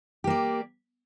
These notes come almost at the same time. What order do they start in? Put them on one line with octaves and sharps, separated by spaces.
G4 A#3 D5